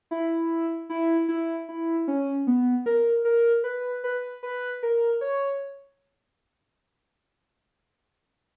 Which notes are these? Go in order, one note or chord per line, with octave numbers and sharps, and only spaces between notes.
E4
E4
E4
E4
C#4
B3
A#4
A#4
B4
B4
B4
A#4
C#5